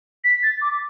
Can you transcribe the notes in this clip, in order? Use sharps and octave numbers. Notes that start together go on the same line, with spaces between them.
B6
A6
D6